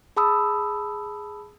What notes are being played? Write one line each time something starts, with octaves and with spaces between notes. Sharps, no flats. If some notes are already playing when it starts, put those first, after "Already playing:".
G#4 A5 B5 D#6 E6